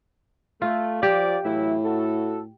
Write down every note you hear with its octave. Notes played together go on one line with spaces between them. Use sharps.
A3 F4
F3 G4 D5
A2 E3 F#3 E4
F#4 A4